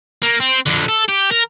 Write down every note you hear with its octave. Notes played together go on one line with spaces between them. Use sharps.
A#3
C4
F2 D3
A4
G4
A#4